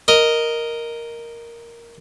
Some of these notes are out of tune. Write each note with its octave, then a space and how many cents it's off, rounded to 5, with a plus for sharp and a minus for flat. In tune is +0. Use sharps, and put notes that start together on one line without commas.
A#4 +0 D#5 +0